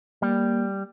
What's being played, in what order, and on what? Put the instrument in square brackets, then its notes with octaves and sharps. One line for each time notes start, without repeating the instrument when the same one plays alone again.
[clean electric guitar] G3 [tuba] A#3